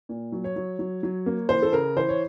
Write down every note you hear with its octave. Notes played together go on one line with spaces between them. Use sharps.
A#2
F#3
C#5
F#3
F#3
F#3
A#3
E3 C5
A4
C#3 A#4
E3 C5
C#5